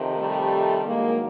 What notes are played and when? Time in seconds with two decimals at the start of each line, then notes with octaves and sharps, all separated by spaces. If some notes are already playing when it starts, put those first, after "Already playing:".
Already playing: F2 C3 D#3
0.18 G3 A3
0.86 G2 D#3 F#3 G#3 A#3